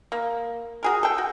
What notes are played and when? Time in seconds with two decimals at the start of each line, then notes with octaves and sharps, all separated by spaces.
0.12 A#3
0.83 F#4 G#4 A#4
1.03 A4 G5
1.18 F#4